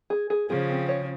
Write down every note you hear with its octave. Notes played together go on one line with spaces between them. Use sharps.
G#4
G#4
C#3 F3 G#4
C4
C#5